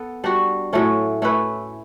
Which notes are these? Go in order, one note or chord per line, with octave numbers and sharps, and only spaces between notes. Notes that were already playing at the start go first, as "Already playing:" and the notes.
Already playing: B3 A4
G3 D4 F#4
A2 F#3 A3 C#4
A3 C#4 E4 B4